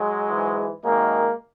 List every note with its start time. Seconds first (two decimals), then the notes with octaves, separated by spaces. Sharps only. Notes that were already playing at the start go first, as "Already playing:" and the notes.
Already playing: F#3 G#3
0.28 G#2 E3
0.83 F#2 D#3 G#3 A#3